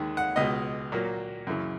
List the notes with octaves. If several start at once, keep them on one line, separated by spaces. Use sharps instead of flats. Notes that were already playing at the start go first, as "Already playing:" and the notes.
Already playing: D#2 D#3 G#3
F#5
C#2 B2 G#3 D#5
A#2 F#3 A#3
F#2 C#3 E3